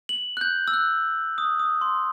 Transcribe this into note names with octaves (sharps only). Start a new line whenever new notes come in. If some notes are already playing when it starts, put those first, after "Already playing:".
F#7
F#6
G6
E6
F#6
D#6
D#6
C6